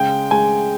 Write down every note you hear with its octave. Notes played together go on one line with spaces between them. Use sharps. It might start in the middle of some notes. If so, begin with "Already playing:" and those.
Already playing: C#3 G#3 G5
G#3 G#5